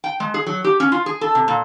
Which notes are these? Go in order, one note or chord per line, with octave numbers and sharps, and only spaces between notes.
G5
G#3
G#4
F#3
G4
C#4
F4
G#4
A4
C3
A#2